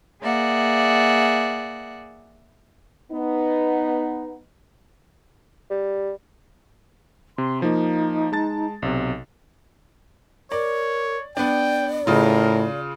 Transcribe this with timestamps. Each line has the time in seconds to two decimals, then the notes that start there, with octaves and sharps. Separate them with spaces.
0.22 A#3 G#4 D5 E5 F#5
3.12 B3 D#4
5.70 G3
7.38 C3 C6
7.62 F3 A#3 D#4
8.32 G#3 A5 A6
8.82 B1 C3
10.52 A#4 C#5 D5
11.37 B3 D4 D5 G5
12.07 A2 C#3 F4 A#4